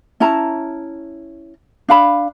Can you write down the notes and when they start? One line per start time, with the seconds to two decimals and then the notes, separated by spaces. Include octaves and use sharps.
0.20 C#4 E4 A5 A#5
1.89 D4 F5 B5